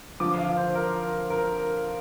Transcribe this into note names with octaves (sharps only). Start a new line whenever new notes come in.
D3 F3 D6
F5
C5
A#4
A#4